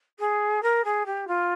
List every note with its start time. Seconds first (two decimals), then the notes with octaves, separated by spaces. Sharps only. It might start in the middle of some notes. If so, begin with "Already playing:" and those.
0.19 G#4
0.62 A#4
0.84 G#4
1.06 G4
1.27 F4